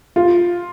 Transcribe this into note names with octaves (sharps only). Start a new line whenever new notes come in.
F4